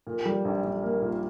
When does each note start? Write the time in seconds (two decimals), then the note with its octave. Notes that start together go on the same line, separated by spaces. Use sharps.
0.07 A#2
0.25 G3
0.45 A#1
0.64 A#1
0.83 A#3
1.02 A#2